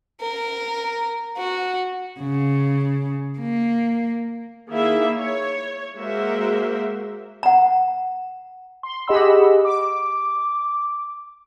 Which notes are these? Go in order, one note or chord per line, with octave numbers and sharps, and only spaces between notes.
A#4
F#4
C#3
A#3
D#3 A#3 E4 G#4 E5
C#5
G#3 A#3 F#4 A#4 C5 E5
F#5 A#5
C6
G4 G#4 D#5 F#5 B5 E6
D6